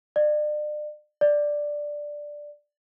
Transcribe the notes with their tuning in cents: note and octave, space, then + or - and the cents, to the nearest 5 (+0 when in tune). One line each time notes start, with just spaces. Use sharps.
D5 +40
D5 +5